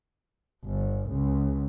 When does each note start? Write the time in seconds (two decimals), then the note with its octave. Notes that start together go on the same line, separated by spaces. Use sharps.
0.65 G1
1.10 C#2